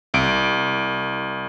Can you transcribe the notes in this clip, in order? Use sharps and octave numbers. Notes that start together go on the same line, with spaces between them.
C2 D7